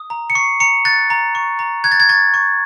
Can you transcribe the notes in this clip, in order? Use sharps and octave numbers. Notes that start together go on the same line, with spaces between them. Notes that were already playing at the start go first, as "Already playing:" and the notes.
Already playing: D#6
A#5
C#7
C#6 C7
A#5 C#7
F#6 A6
A#5
C#6
A#5
F#6 G#6
A6
G#6
C#6 A6
C#6